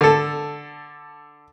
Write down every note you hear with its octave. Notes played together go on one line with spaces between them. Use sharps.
D3 A4